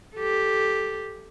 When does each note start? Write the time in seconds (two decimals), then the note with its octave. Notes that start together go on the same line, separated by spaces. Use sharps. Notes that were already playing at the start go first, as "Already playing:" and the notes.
0.16 G4 A4